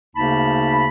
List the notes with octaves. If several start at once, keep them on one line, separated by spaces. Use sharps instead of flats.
D2 C#3 A#3 D#4 A5 B5